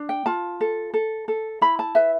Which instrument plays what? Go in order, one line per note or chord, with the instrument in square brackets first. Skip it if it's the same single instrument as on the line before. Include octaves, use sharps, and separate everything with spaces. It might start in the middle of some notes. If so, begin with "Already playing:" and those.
Already playing: [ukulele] D4
G5
F4 A5
A4
A4
A4
E4 B5
A5
B4 E5